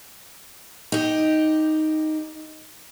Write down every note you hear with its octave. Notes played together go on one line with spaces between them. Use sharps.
D#4 G4